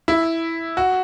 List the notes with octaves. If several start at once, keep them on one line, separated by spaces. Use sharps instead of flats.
E4
F#4